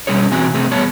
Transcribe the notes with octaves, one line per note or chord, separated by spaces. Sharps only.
B2 G3 C#4 G#4 C#5
B2 E3 C4 F#4 G#5
C3 A3 C4 G#4
E2 G3 B3 C#5 A5